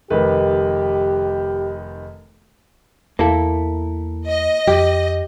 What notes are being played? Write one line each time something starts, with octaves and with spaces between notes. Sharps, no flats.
F1 D#3 G4 B4
E2 A#3 E4 A4
D#5
F2 G4